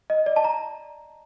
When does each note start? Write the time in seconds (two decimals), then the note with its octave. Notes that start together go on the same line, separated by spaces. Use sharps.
0.10 D#5
0.26 D5
0.36 A5
0.44 A#5